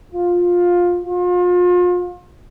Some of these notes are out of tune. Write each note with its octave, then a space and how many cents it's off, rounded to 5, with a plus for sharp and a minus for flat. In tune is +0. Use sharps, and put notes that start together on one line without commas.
F4 +15
F4 +35